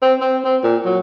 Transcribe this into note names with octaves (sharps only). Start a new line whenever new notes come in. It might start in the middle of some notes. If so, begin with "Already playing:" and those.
C4
C4
C4
A#2
F#3